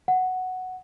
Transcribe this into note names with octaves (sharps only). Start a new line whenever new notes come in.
F#5